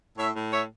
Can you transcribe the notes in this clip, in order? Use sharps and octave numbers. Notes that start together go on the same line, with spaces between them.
A2 C#5 E5
A2
C#5 E5